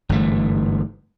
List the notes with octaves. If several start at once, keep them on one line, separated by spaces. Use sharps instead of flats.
G1 G#2 E3 A3